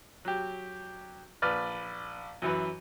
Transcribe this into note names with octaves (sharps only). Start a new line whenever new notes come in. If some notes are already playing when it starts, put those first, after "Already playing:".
F#3 G4
A#1 B4 D5 F6
F#2 E3 B4